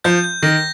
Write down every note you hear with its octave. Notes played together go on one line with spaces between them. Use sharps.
F3 G6
G6
D#3 A#6